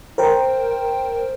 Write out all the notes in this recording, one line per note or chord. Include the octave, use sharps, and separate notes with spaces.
A#4 C5 G5